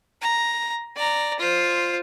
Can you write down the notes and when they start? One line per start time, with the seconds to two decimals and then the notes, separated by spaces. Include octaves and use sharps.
0.22 A#5
0.96 D5 A#5
1.39 F4 C5